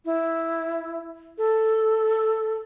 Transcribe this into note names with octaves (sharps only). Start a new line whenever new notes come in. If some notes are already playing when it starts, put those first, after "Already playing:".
E4
A4